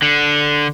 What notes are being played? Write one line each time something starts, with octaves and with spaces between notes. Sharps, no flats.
D3